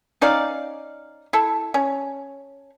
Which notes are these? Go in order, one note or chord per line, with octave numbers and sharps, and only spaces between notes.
C#4 D#4 D5 F5
E4 A4
C#4